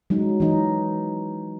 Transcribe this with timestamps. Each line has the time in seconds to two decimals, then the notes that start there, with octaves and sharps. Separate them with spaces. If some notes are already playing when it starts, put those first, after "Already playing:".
0.10 F#3 G#3 D#4
0.40 E3 D#4